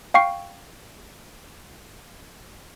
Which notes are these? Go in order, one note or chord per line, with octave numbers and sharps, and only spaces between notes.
F5 G5 C#6 C7